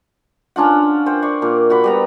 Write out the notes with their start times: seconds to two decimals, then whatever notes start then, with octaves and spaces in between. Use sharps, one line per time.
0.56 C#4 D4 F4 F#5
1.06 C5 F#5 G5
1.22 D5 C6 C#6
1.42 A#2
1.70 F#4 F#5 B5
1.84 G3 B3 A#5